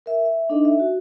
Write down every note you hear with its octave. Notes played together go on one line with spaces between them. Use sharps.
A#4 E5
E5
D4 D#4 A4 D#5
E5
F#4